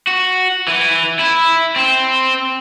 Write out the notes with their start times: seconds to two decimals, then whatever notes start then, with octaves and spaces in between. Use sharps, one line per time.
0.07 F#4
0.68 E3
1.19 E4
1.76 C4